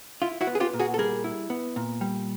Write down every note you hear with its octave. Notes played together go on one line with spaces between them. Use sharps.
E4 F4
E4 F#4
B3
G#4
F4 G4
A#2
F#4 G#4
A4
G3 G#4 A#4
E4
B3
A#2
G3